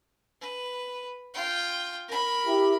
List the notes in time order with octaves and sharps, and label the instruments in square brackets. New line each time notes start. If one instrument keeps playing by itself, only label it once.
[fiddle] B4
F4 G5
A#4 B5
[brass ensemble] E4 G4